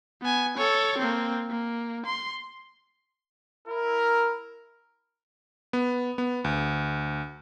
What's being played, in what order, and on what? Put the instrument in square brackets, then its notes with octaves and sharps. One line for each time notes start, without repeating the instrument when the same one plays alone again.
[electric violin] B3 G#5
A4 C#5
A#3 C4
A#3
C6
[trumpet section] E4 A#4
[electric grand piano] B3
B3
D2